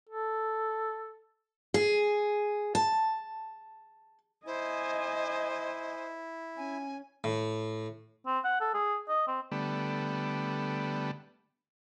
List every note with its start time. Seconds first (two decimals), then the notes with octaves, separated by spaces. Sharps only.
0.09 A4
1.74 G#4
2.75 A5
4.46 E4 C5 D#5 G#5
6.57 C#4 G#5
7.24 A2
8.27 C4
8.44 F#5
8.61 A4
8.74 G#4
9.08 D#5
9.28 C4
9.52 D3 G3 A3 B3